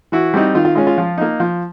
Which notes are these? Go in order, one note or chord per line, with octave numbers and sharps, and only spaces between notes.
E3 E4 F#4
G3 C4 D#4
D#3 F4
F4
G#3 C#4 F4
F4
F3
A#3 D#4
F3